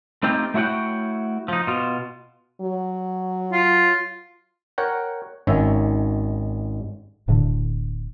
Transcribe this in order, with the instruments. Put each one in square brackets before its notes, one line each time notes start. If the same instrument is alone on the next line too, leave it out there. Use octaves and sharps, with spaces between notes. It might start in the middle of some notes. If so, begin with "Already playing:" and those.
[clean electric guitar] A3 C4 D#4 F4 G4 G5
A3 E4 F#4 C#5 F#5 G5
F3 D#4
B2 F4
[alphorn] F#3
[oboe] F4
[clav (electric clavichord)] A#4 C#5 F#5 G5
G#1 D#3 C#4 C#5 E5
[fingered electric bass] D1 A2 D3